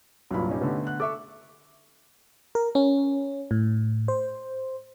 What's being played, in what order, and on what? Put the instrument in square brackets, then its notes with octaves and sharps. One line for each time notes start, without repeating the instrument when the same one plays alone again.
[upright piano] C2 G2 A#2 [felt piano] F#3 B5
[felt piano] C#4 D#4 G4
[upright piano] D3 A3 B3
[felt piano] F#5 F#6
[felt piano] A4 E5 C#6 [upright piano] D6
[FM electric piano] A#4
C#4
A2
C5